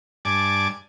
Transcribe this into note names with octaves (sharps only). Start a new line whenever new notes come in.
G2 D5 G#5 A5 D6